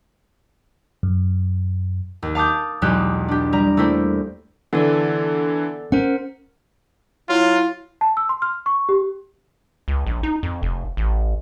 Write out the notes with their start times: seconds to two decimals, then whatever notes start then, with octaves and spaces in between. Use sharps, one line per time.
1.03 F#2
2.23 D#2
2.35 F5 A5 D6 D#6 G6
2.82 B1 E2 G#3 G4 F#6 E7
3.28 D4 G4
3.53 G3 A#5
3.77 A3 A#3 E4 G4 C5
4.73 D3 E3 B3 A4 D5
5.92 C#4 A#4 C5 F#5
7.29 F#3 E4 F4
8.01 A5
8.17 E6
8.29 C6
8.42 F6
8.66 C#6
8.89 G4
9.88 C#2
10.06 A#1
10.23 D#4
10.43 F2
10.62 F1
10.97 A1